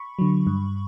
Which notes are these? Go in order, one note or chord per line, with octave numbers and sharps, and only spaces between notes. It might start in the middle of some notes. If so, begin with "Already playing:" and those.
Already playing: B5 C#6
D3 F#3
G2